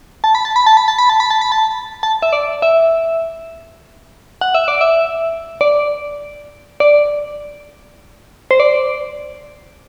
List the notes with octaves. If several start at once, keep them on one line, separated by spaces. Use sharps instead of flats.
A5
B5
A5
B5
A5
B5
A5
B5
A5
B5
A5
B5
A5
A5
E5
D5
E5
F#5
E5
D5
E5
D5
D5
C5
D5